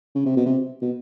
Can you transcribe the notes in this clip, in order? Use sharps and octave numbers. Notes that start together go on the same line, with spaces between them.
C#3
C3
B2
C3
B2